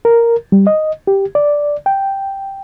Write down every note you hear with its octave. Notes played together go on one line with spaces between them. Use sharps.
A#4
G3
D#5
G4
D5
G5